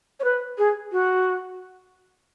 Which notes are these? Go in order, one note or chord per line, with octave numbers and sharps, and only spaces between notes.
C#5
B4
G#4
F#4